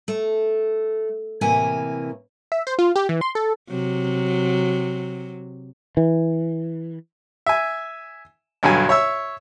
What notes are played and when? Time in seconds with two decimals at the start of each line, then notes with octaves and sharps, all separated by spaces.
0.08 A3
1.41 A2 C3 E3 A#3 G#5
2.52 E5
2.67 C5
2.79 F4
2.96 G4
3.09 E3
3.21 C6
3.35 A4
3.69 C3 F#3
5.97 E3
7.46 E5 G#5
8.63 B1 G2 D3 F#3 G#5
8.89 C#5 E5 E6